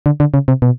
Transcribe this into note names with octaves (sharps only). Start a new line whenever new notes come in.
D3
D3
C#3
C3
B2